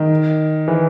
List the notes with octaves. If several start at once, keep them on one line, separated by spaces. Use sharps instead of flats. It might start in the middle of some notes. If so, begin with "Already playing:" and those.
Already playing: D#3
E3